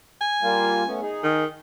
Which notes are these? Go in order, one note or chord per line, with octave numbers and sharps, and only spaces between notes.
G#5
G3 A#3 F4
A3 B3 C#4
D#4 G#4
D#3